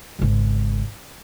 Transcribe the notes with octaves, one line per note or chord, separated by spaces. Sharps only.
G#1 C#3